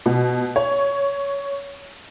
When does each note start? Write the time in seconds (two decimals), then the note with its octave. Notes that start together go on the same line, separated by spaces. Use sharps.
0.06 B2
0.56 C#5